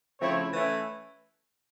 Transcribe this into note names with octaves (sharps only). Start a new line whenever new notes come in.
C#3 F3 A3 C4 E4 C#5
E3 A3 C#4 E4